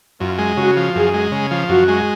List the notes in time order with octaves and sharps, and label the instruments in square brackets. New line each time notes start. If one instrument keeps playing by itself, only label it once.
[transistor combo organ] F#2 [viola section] F4
[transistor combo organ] G#3
[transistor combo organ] C#3 [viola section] F#4
[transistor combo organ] F3
[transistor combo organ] F#2 [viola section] G#4
[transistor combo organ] G#3
C#3
F3
[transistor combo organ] F#2 [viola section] F#4
[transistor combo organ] G#3